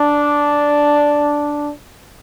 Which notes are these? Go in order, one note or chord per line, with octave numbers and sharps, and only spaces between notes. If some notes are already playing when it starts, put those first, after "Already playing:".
Already playing: D4